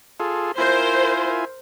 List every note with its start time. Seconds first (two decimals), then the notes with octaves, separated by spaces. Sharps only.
0.20 F4 G#4 A4
0.58 E4 F4 A#4 C5 G#5